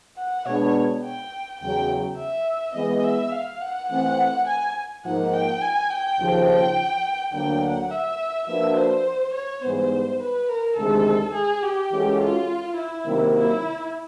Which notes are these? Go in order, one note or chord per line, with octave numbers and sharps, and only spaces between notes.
F#5
B2 G#3 B3 D4 C#5
G5
E2 C#3 F#3 G5
E5
E3 G#3 B3 D#5
E5
F5
F#5
E3 A3 C4 F#5
G#5
G#2 F3 A#3 D#4 F#5
G5
G#5
G5
D#2 C#3 F3
G5
D2 D3 F#3 A#3 D4 G5
F#5
E5
F3 A#3 D4 F#4 B4 E5
C5
C#5
G#2 E3 G3 B3 C5
B4
A#4
D2 C3 D#3 G#3 A4
G#4
G4
E3 G#3 C#4 F#4 A4
F4
E4
C3 D#3 F#3 A#3
E4